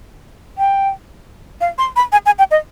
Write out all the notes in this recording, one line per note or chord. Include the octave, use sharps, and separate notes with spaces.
G5
F5
C6
B5
G#5
G#5
G5
D#5